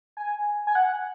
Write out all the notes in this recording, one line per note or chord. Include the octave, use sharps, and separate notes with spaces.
G#5
G#5
F#5